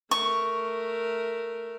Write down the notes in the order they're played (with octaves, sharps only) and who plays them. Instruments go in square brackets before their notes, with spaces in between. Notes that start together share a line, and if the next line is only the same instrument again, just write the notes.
[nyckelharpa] A3 A#4 [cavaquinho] C#6